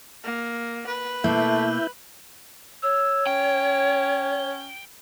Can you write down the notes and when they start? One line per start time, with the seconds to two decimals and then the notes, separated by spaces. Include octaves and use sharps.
0.23 A#3
0.87 B4
1.24 B2 A3 A#3 E4 E5 G6
2.83 C#5 E6
3.27 C#4 G5